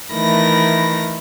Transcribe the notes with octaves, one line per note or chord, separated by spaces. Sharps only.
D#3 E3 A3 A#4 B5 A#6